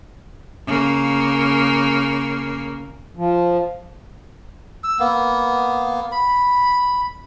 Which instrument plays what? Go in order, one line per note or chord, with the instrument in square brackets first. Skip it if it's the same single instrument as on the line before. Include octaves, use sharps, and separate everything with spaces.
[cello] C#3 A#3
[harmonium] F3
[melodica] E6
A#3 B3
B5